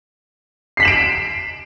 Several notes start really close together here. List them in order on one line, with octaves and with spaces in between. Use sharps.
C7 B6 F#7 E7 D7